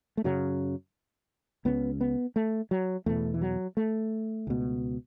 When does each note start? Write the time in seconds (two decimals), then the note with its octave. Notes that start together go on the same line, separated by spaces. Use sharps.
0.17 A3
0.24 F#2 C#3 F#3
1.65 C#2 C#3 B3
2.01 B3
2.36 A3
2.71 F#3
3.06 E2 B2 A3
3.34 E3
3.41 F#3
3.77 A3
4.47 C#2 B2